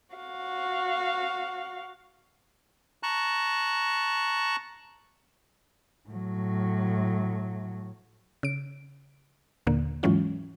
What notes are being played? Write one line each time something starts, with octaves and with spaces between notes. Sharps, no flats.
F#4 F5
A5 A#5 C#6 F#6
A2 F#3
C#3 D7
D#2 A#2 D3 A#3
G#2 E3 F#3 G#3 C#4 F4